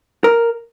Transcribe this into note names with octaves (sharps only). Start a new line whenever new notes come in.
A#4